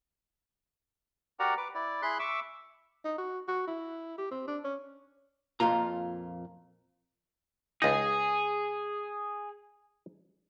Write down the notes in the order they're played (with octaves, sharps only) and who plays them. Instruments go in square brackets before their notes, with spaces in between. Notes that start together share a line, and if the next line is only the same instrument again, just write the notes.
[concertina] F#4 G4 A#4 D5 F#5 A#5
B4 D6
E4 D5
E4 G#4 B5 C6 F#6
E5 C#6 D6 E6
[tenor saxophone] D#4
F#4
F#4
E4
G4
C4
D4
C#4
[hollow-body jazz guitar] F2 A#2 F4 A#5
[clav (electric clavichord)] C#2 D#4 [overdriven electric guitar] G#4